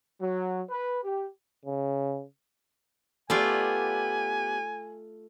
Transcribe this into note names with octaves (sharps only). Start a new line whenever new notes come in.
F#3
B4
G4
C#3
A3 B3 F4 G4 D5 G#5